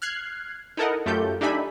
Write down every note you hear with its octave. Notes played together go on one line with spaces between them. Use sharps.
F6 F#6 G#6 C7
D#4 E4 A4 A#4 D#5 F#5
F#2 A3 F4 G4 A4 G6
D4 D#4 G4 E5 G#5 B5